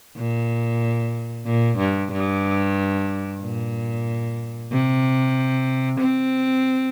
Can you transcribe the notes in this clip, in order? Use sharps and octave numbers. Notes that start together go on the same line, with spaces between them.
A#2
A#2
G2
G2
A#2
C3
C4